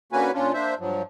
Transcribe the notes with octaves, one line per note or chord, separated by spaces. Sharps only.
D3 A#3 C#4 F#4 B4 G#5
A#2 C#4 D4 F4
A#3 D4 C5 E5
G2 F3 F#3